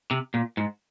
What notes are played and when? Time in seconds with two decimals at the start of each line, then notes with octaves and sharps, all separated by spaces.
0.11 C3
0.34 A#2
0.57 G#2